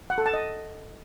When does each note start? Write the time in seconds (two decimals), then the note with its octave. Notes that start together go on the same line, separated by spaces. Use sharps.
0.10 F#5
0.18 A4
0.26 A5
0.34 D#5